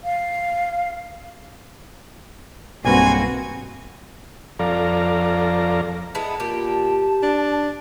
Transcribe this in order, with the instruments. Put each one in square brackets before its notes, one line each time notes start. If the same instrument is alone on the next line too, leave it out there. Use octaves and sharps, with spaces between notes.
[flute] F5
[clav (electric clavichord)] B1 G2 B4 [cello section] A#3 C4 F#4 [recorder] G#5
[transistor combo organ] F2 A4 D5 F5 A#5
[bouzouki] G#3 B3 E4 [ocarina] A5
[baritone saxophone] A#2 [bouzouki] G4
[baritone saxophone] D4